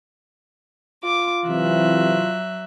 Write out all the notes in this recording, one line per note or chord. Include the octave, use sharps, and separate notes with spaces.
F4 D6
C3 E3 F#3 E5 F#6